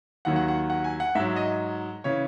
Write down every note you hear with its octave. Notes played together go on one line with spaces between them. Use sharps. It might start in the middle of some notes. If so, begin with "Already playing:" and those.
D#2 D#3 F#3 F#5
F#5
F#5
F#5
G#5
F#5
G#2 F#3 E5
D#5
C#3 E3 C#5